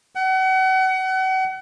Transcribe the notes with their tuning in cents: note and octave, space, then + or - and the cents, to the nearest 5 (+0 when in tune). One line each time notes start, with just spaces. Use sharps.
F#5 +35